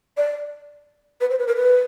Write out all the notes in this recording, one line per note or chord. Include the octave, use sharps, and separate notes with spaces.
D5
B4
C5
B4
A#4
B4